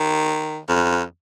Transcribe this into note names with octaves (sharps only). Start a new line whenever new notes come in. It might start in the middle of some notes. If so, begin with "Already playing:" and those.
Already playing: D#3
F2